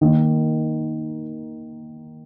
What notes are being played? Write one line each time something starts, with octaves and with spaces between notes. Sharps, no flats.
D#3 A#3 D#4